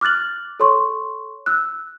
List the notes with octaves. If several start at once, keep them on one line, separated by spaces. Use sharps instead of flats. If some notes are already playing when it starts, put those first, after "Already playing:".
D6 F6 F#6 A6 F#7
A4 C#5 C6 C#6
E6 F#6